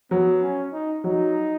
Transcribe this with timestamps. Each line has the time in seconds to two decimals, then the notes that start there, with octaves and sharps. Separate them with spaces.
0.11 F#3 B3
0.42 C#4
0.73 D#4
1.04 F#3 D#4